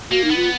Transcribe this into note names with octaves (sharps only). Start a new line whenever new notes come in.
A#3 F#4
D#4
B3
F4